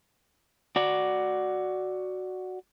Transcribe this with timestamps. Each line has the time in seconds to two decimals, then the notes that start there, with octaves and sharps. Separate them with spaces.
0.76 F#4 D5